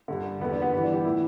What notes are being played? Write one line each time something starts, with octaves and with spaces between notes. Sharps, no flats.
G2 D3
E2 D3 B3
D4
B3
G2 E3 B3
D4
G4
A2 E3 E4